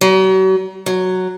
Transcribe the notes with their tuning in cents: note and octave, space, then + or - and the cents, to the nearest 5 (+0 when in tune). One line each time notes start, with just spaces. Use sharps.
F#3 +40
F#3 +0